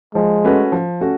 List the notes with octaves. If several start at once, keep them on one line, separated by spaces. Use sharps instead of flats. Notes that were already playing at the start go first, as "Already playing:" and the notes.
F3 G#3
A3 C#4 F#4 B4
F3
A3 C#4 F#4